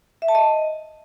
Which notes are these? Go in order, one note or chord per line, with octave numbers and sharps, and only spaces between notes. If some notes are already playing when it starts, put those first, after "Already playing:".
E5
A5
D#5